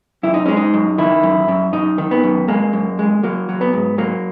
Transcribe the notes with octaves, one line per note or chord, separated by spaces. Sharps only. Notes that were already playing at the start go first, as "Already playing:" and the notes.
F#2 E4
D#4
G#3 C#4
D#4
F#2
D#3 E4
F#2
F#2
F#2 D#4
D#3
B3
F#2
G#3 A#3
F#2
G#3
F#3 A#3
F#3
B3
G#2
F#3 A#3